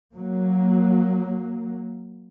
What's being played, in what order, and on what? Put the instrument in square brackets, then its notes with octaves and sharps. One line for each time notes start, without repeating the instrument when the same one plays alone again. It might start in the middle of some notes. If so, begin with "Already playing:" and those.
[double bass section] F#3 A#3